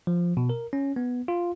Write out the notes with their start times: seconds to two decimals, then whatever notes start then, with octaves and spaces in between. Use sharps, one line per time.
0.07 F3
0.37 B2
0.49 A#4
0.73 C#4
0.96 B3
1.28 F4